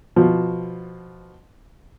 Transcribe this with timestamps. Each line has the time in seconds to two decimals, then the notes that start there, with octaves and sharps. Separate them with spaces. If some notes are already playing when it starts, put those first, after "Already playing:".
0.16 B2 F3